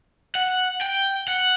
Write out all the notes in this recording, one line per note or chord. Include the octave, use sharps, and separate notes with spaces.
F#5
G5
F#5